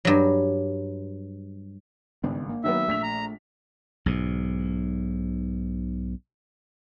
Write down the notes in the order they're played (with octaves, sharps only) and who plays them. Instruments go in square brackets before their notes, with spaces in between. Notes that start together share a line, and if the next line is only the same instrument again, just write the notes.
[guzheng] G2 F#3
[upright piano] G#1 G2 [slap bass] C#3 B3 D4
[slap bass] A#3
[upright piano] D#3 F#3 B3 [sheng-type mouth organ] E5
[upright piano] A#1 B6 F7 [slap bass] A3
[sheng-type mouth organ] A#5
[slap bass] B1 G#2